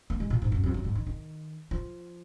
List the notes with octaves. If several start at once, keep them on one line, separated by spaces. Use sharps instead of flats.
A#3
G#3
A#2
G#2
F#2
F2
F#2
G#2
D#3
D#3
F3